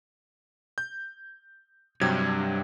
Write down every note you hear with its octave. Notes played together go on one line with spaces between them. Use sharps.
G6
G2 C3 F#3 G#6